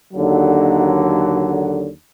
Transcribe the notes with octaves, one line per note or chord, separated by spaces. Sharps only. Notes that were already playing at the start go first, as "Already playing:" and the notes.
D#2 D3 F#3